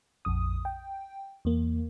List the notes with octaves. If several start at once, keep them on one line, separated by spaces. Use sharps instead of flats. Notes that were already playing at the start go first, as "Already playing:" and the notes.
A#1 F2 D#6
G5
E2 A#3